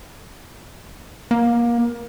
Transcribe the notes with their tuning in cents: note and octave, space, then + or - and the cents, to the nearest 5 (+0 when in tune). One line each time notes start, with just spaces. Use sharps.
A#3 +25